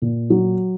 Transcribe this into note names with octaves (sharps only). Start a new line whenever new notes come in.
A#2
F#3